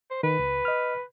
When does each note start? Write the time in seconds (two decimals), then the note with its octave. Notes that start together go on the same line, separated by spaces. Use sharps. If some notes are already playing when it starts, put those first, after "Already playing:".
0.11 C5
0.23 D#3 B4
0.39 C#2
0.65 D#5 F6